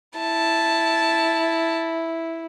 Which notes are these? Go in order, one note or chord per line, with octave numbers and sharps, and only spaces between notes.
E4 A5